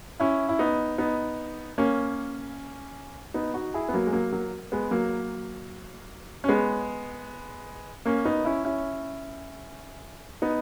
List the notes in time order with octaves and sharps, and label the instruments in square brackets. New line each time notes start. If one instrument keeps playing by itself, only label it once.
[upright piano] C#4 E4
E4
B3 D#4
B3 D#4
A#3 C#4
B3 D#4
D#4 F#4
E4 G#4
B3
F#3 A#3
G#3
F#3 A#3
F#3 A#3
G#3 B3
F#3 A#3
C#4
G#3 B3
A#3 C#4
B3 D#4
C#4 E4
C#4 E4
B3 D#4